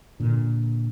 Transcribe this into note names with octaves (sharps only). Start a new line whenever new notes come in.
A#2 D3